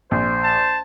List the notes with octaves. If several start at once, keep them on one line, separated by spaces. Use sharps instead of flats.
A#1 C5
A5